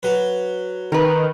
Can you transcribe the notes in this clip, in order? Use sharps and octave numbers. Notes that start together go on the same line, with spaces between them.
F#3 B4
D#3 A#4 B4